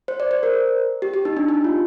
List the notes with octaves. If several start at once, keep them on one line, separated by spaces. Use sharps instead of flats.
C5
D5
C5
A#4
G4
G4
D#4
D4
D#4
F4